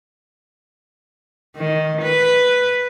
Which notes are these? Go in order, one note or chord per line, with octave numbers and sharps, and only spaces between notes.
D#3
B4